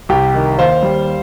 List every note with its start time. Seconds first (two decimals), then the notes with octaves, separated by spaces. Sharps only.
0.09 C2 G4
0.34 D#3
0.59 D#2 C5 F5
0.83 G3